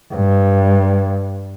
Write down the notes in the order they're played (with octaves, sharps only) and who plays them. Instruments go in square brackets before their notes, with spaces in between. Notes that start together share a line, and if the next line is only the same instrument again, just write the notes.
[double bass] G2